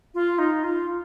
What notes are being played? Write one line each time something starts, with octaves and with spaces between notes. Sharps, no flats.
F4
D#4
F4